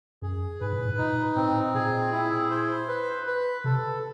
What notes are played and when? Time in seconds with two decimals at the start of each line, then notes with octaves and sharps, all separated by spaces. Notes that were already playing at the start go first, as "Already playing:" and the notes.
0.22 F#2 G#4
0.61 G#2 B4
0.73 A2
0.85 G#2
0.98 A#2 D#4
1.36 A2 C4
1.74 A#2 G#4
2.12 E4
2.50 C5
2.88 B4
3.26 B4
3.64 C3 A4